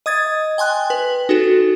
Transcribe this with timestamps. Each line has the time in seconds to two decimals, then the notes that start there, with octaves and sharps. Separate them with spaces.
0.06 D#5 D#6 G#6 A6
0.58 G5 G#5 C6 F#6
0.90 B4
1.29 D#4 F#4 A4